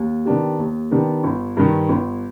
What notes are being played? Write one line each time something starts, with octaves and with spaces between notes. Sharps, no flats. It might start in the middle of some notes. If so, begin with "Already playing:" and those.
Already playing: D#2
D#3 B3 D4 G4
D#2
D#3 B3 D4 G4
G1
G2 D#3
G1